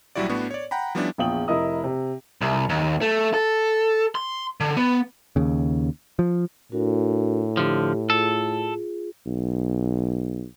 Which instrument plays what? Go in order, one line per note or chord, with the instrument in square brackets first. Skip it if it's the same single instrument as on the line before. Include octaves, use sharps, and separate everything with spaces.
[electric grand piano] A#1 F#3 G3 E4 F#4 D5
A2 B3 D4 F#4
C#5 D5
F#5 G5 A#5 B5
F3 G3 B3 C#4 D4 E4
[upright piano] A#1 E2 F4 G5 D#6 F#7
F1 E4 A#4 D#5 D#6
C3
[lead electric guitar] C2
D#2
A3
A4
C6
D3
B3
[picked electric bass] D#2 C#3
F3
[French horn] A2 [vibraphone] D4 F#4 A#4
[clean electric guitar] D3 F3 [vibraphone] G4
[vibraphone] F4 G#4 [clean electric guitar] A4
[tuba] B1